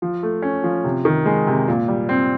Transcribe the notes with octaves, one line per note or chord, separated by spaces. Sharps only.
F3
A3
C#4
F3
C3
D#3
G#3
C3
A#2
G3
C4